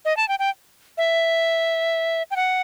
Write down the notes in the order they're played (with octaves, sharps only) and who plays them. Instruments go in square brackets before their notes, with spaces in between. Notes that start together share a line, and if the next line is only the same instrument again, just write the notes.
[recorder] D#5
A5
G5
G5
E5
G5
F#5